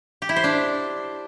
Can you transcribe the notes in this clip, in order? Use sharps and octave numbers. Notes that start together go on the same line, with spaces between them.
G4
E4
C5
D4